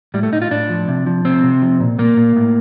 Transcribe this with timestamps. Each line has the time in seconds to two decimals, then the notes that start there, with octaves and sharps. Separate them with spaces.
0.14 A2 G3
0.23 A3
0.32 A2 D#4
0.42 F4
0.51 A2 D4
0.70 F3
0.88 C3
1.06 F3
1.25 C3 C4
1.43 C3
1.62 F3
1.80 A#2
1.99 A#2 A#3
2.17 A#2
2.36 A2